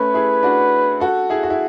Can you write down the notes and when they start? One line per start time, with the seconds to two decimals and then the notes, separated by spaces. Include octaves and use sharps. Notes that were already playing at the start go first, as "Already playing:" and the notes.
Already playing: A3 C#4 B4
0.14 E4 G#4
0.43 D4 F#4
1.00 F#4 A4
1.30 E4 G#4
1.43 F#4
1.50 E4